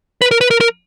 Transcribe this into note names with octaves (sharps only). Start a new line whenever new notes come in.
B4
A#4
B4
A#4
A#4